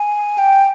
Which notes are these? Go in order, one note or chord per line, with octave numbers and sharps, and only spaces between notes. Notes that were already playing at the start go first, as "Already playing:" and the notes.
Already playing: G#5
G5